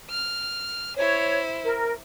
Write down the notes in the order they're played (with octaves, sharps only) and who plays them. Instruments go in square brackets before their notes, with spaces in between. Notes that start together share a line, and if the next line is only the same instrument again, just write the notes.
[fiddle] F6
[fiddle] E4 C5 [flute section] C#5
[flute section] A#4